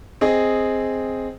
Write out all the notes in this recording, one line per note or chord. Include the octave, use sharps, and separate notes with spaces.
C4 G#4 D#5